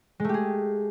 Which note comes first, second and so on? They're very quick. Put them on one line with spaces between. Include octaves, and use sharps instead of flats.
G#3 A3 G4 G#4